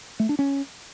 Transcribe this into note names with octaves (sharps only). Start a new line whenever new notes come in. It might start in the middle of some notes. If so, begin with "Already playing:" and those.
A3
D4
C#4